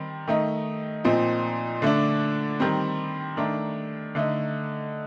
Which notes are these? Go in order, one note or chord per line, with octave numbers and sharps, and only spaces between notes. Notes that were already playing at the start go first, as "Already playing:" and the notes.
Already playing: D#3 G3 C4
D#3 A3 D#4
A#2 F3 C4 D#4
D3 A3 D4
D#3 G3 C4
D#3 A3 D4
D3 A3 D#4